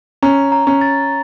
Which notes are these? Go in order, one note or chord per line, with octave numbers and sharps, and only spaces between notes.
C#4 A#5
A#5
C#4
A6